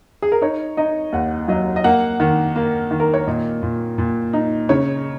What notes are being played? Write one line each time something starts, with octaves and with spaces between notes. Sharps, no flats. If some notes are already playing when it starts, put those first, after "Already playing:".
G#4
A#4
D#4 C#5
D#4 D#5
D#2 F#5
F#3 D#5
D#5
A#3 F#5
D#3
A#3
D#3
A#4
C#5
A#2 D#5
A#2
A#2
D#4
C#3 C#5